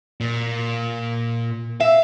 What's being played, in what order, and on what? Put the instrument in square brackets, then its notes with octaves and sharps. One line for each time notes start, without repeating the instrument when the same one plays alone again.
[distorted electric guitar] A#2
[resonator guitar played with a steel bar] E5 [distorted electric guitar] F5